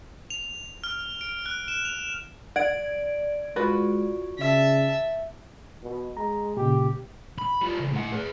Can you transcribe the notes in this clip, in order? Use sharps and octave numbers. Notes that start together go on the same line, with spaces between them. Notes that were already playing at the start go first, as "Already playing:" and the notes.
F7
F6
D7
F#6
E7
F7
D5 F#5 G#6 D7
G#3 F4 F#4 B4
C#3 E5 A5
B2
G#3 A#5
A#2 C#3 G4
B5
G3 F4
C#3 E3
A2 F#5
G#4 B4